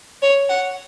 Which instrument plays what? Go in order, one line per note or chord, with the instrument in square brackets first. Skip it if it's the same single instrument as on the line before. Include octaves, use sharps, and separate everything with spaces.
[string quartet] C#5
F#5